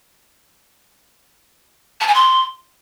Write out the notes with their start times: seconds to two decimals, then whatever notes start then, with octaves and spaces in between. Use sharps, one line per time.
2.00 A5
2.07 G#5
2.14 C6